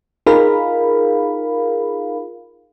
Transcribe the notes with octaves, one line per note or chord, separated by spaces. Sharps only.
D#4 F4 G#4 A#4 F5 B5